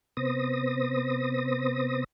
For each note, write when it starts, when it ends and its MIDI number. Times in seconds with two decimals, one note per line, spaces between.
0.17 2.04 48
0.17 2.04 59
0.17 2.04 72
0.17 2.04 87
0.17 2.04 94